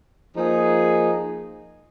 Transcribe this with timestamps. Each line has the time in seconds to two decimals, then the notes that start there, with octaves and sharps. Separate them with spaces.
0.36 F3 A#3 D#4 G#4